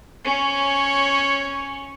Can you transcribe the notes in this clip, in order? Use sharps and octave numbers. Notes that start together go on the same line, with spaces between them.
C#4 C#5